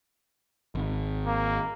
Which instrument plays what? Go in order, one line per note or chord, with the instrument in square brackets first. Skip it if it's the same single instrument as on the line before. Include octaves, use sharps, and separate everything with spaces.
[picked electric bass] G#1
[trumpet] A#3